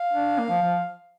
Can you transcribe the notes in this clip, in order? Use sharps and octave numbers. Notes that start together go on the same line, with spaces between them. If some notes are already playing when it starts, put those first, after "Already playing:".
Already playing: F5
D4
A#3
F3
F3